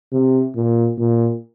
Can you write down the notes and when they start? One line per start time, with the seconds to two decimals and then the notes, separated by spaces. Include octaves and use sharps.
0.12 C3
0.56 A#2
0.98 A#2